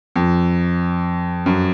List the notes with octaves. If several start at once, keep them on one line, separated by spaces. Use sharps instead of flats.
F2
F#2